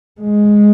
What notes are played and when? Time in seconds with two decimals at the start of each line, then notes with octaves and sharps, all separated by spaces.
0.21 G#3